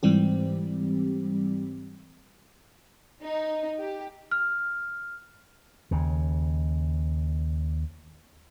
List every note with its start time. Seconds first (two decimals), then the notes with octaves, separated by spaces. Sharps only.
0.03 G#2 E3 G3 C4 G4
3.24 D#4
3.80 G4
4.32 F6
5.91 D#2 C#3